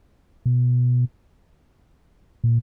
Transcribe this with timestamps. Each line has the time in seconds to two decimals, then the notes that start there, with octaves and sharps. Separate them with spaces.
0.46 B2
2.44 A#2